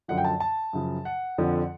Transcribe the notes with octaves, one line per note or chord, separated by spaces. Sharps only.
F#2 D3 F3 F#5
G5
A5
A5
F#2 C#3 F3
F#5
F2 D3 F3